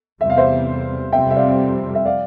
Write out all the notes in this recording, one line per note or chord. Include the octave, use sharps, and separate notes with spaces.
E2 C3 G3 C4 E5
F5
C5 E5
F2 C3 G3 C4 E5 G5
E5
D5 F5
E5
D5 F5